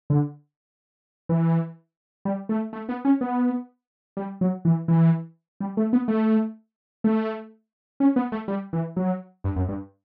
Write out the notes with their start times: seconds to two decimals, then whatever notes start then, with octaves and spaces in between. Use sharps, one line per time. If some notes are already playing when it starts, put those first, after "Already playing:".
0.10 D3
1.29 E3
2.25 G3
2.49 A3
2.73 A3
2.89 B3
3.05 C#4
3.21 B3
4.17 G3
4.41 F#3
4.65 E3
4.88 E3
5.60 G3
5.77 A3
5.93 B3
6.08 A3
7.04 A3
8.00 C#4
8.16 B3
8.32 A3
8.48 G3
8.73 E3
8.97 F#3
9.44 G2
9.56 F#2
9.68 G2